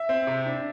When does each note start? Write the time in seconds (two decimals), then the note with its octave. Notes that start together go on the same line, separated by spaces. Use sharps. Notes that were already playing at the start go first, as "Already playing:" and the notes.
Already playing: E5
0.09 C4
0.27 C3
0.46 D4